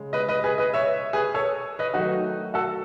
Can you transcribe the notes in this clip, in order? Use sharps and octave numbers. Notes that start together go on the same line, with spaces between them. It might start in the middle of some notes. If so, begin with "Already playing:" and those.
Already playing: C#3 G#3
B4 D#5
B4 D#5
G#4 B4
B4 D#5
C#5 E5
G#4 B4
A4 C#5
B4 D#5
D#3 F#3 A3 D#4 F#4
F#4 A4